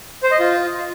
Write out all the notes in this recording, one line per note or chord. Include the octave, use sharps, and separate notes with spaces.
C5
D#5
F4